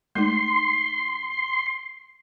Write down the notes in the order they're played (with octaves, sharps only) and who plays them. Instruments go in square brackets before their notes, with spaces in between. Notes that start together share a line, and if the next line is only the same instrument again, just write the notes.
[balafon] G#3 A3 D#4 [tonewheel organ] C6